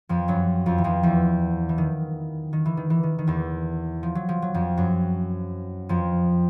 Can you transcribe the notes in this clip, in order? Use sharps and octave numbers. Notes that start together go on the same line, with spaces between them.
F2 F3
F#2 F#3
F2 F3
E3
F2 F3
E2 E3
E3
D#3
D#3
E3
D#3
E3
D#3
D#3
E2 E3
F3
F#3
F3
F#3
F2 F3
F#2 F#3
F2 F3